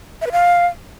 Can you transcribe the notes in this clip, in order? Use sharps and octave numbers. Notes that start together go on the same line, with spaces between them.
E5
B4
F5